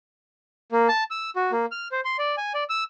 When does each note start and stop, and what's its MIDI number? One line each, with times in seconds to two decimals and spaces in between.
0.72 0.88 58
0.88 1.04 81
1.11 1.30 88
1.36 1.52 66
1.52 1.66 58
1.72 1.88 89
1.92 2.01 72
2.05 2.17 84
2.18 2.36 74
2.37 2.53 80
2.54 2.64 74
2.69 2.84 88